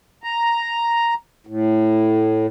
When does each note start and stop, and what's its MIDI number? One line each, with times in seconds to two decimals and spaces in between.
0.24 1.14 82
1.47 2.46 45